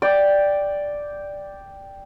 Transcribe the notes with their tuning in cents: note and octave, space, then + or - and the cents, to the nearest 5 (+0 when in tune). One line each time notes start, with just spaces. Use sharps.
D5 +0 G5 +0